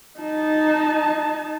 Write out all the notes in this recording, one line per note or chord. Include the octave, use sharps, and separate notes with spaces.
D#4 A5